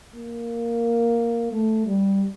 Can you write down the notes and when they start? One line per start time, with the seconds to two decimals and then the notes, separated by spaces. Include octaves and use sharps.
0.15 A#3
1.52 A3
1.86 G3